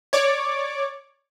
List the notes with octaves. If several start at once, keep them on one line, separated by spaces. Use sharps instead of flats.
C#5 D5 D6